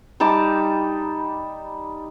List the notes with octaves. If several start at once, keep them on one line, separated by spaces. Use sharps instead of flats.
G3 D#4 A5 D6